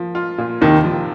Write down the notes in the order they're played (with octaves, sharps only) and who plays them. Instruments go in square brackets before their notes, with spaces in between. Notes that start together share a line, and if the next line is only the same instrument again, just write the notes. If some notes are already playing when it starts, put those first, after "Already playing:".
Already playing: [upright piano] F3 A#3
F4
A#2
[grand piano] D#2 D#3 [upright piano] C3
[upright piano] F3